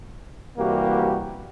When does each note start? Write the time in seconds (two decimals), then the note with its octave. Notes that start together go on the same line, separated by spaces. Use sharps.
0.57 C2 E3 G3 A#3 F#4 G4